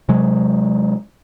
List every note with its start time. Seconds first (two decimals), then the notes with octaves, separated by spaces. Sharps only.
0.09 C3 F#3 G#3